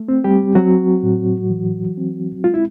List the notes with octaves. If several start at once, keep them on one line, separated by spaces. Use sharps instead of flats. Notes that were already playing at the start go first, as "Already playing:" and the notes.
Already playing: A3
C4
G3 G4
F#3 C4 F#4
A2
E3
C4
G#3 F4
E4